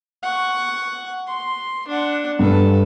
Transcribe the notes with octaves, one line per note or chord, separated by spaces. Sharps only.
F#5 C#6
C6
D4 F#5
G2 A4 B4